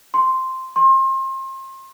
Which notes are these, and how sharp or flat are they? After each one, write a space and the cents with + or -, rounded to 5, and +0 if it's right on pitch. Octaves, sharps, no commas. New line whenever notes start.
C6 +0
C6 +35